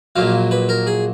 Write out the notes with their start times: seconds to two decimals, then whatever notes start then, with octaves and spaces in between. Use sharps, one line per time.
0.16 A#1 A#2 F#3 F5
0.51 B4
0.69 A#4
0.87 G#4